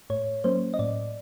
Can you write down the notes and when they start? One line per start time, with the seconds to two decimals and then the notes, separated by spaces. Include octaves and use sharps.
0.10 A2 C#5
0.44 F#3 A#3 C#4 C5
0.74 D#5
0.79 A2 D5